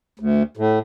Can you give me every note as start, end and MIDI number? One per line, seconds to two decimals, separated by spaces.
0.20 0.43 38
0.57 0.79 45